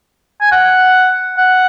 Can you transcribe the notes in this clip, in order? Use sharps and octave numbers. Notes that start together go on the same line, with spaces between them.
G#5
F#5
F#5